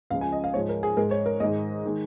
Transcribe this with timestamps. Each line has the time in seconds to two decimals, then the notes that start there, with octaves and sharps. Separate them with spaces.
0.10 C#2 C#3 F3 G#3 F5
0.21 G#5
0.32 D#5
0.44 F5
0.54 G#2 F3 G#3 C#5
0.69 A#4
0.83 G#4
0.97 G#2 G#3 A#4
1.11 C#5
1.26 A#4
1.40 G#2 D#3 G#3 D#5
1.85 D#3 G#3